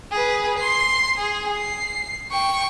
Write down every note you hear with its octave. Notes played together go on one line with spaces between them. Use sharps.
G#4 B4
C6 C7
G#4
C7
G5 C#6